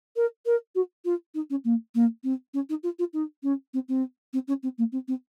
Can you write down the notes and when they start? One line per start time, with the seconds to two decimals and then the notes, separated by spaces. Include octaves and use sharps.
0.16 A#4
0.46 A#4
0.75 F#4
1.05 F4
1.34 D#4
1.50 C#4
1.65 A#3
1.95 A#3
2.24 C4
2.54 C#4
2.69 D#4
2.83 F4
2.99 F4
3.13 D#4
3.43 C#4
3.74 C4
3.89 C4
4.33 C4
4.48 C#4
4.63 C4
4.78 A#3
4.92 C4
5.08 C4